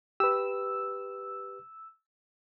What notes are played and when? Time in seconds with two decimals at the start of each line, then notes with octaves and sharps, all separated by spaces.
0.20 G4 B4 E6